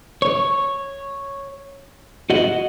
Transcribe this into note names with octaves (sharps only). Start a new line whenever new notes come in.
C#5
F#4 D#5 F#5